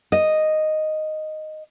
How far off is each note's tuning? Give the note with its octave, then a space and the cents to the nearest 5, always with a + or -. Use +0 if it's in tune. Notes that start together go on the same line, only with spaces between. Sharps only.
D#5 -5